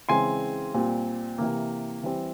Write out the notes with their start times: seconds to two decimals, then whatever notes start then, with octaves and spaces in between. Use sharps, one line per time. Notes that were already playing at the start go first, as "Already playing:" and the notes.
0.09 C#3 E3 G#3 C4 G#5 C6
0.74 A#2 G3 C4
1.38 C3 E3 A#3
2.03 E3 G3 C4